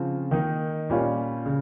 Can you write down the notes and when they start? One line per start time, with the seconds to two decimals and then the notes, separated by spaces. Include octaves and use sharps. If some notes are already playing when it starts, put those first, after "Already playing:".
Already playing: C#3 F3 C4 F4
0.31 D#3 A#3 D#4
0.90 A#2 G3 C#4 F4
1.46 C#3